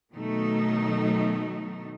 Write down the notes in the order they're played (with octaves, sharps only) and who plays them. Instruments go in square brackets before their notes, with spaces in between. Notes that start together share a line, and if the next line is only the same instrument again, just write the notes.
[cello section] B2 D#3 F#3 A3 D#4